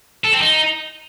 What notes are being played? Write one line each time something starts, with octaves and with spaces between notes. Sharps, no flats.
A4
C4
D#4